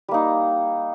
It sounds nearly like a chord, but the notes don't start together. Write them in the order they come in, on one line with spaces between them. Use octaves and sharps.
G3 A#3 D#4